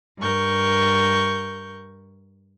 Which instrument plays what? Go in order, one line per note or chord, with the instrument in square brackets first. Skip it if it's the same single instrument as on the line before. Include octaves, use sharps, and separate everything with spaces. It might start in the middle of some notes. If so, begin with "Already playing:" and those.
[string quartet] G2 A#4 C#6 G6